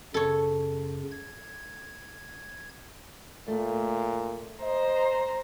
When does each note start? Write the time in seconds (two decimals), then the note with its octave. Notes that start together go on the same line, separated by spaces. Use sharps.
0.14 F#2 C#3 A4 C#5
1.11 G#6
3.48 A#2 A3
4.63 C5 D#5 A#5